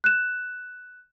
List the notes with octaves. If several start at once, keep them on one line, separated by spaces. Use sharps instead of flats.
F#6 E7